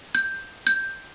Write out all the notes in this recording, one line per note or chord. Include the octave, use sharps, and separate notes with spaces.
G6
G6